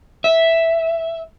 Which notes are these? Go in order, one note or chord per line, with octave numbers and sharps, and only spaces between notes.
E5